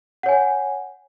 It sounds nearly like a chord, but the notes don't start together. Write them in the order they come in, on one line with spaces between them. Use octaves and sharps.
F#5 C#5 G#5